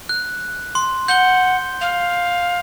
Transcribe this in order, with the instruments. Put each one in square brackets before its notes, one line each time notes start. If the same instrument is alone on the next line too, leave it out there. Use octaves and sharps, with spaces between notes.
[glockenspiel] F#6
C6
[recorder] F#5 [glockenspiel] G6 G7
[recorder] F5